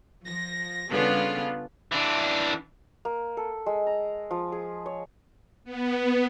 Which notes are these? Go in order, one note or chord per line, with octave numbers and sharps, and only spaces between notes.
F3 A#6
C#3 G3 B3 D4 F4 A4
E3 D4
A#3
A4
G#3
A#5
F3
G#4
C#5
B3